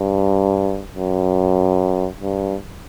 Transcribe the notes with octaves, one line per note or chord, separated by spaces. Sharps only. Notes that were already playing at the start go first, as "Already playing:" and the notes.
Already playing: G2
F#2
G2